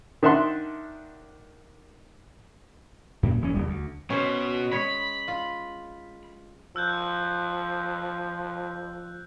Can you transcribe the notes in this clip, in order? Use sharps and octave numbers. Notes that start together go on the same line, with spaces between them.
D#3 D4 E5 F#5 C6
F#2 A#2
D#1 E3 C#4
D#1 G3
D2
B2 C#4 C5
G#3 C#5 B5
F4
F3 E6 F#6 G6